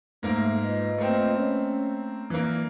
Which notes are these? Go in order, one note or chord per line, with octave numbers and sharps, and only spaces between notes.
G#2 A3 A#3
F4 B4 D#5
A3 A#3 C4
C#4
E3 A#3 D4